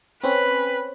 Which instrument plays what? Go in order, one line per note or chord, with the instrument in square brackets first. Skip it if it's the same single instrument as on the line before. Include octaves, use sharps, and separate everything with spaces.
[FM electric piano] C4 C#4 [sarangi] B4